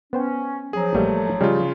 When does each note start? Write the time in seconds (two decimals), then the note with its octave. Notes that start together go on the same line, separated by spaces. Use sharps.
0.13 B3 C#4 C5 G5
0.73 F3 F#3 G#4 A#5
0.95 A1 G3 A3 A#3
1.41 C#3 G3 G#3 F4